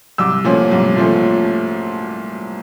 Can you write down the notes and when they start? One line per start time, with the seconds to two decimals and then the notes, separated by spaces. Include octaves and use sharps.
0.18 C2 D6 E6
0.44 A#2 F3 A3 C#4
0.71 C2
0.96 A#2 F3 A3 C#4